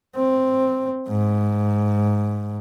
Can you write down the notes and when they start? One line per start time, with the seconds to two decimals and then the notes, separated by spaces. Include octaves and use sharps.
0.16 C4
1.09 G#2